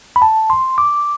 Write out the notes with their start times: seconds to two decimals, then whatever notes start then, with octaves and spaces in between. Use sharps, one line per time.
0.16 B5
0.22 A5
0.50 C6
0.78 D6